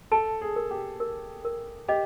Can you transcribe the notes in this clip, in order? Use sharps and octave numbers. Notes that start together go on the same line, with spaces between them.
A4 A5
G#4
A#4
G4
A#4
A#4
G4 D#5